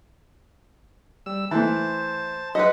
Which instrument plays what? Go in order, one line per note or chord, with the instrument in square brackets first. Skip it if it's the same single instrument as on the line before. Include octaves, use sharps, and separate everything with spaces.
[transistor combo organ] G3 E6
[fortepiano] E3 A3 [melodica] C5 [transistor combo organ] A5
[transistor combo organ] F#3 [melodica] G#3 E5 F#5 [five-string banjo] B4 D#5